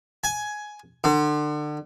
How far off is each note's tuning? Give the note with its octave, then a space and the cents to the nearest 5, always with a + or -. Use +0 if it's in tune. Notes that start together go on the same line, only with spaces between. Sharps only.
G#5 +10
D3 +35